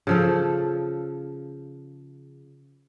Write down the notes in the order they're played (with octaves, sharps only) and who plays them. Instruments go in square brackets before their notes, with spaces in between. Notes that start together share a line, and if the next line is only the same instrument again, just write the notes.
[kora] C#3 F3 A4